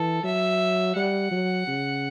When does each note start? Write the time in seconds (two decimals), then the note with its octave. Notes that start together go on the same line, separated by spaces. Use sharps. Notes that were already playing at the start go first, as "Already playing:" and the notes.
Already playing: E3 A4
0.24 F#3 E5
0.95 G3 F#5
1.31 F#3
1.67 C#3